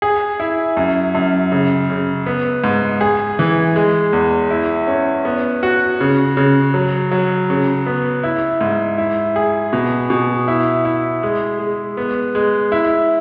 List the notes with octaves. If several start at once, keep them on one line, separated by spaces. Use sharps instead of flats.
G#4
E4
F#2
F#2
C#3
C#3
B3
G#2
G#4
E3
G#3
E2
E4
C#4
B3
F#4
C#3
C#3
F#3
F#3
C#3
B3
E4
G#2
E4
G#4
B2
B2
E4
E4
G#3
G#3
B3
G#3
E4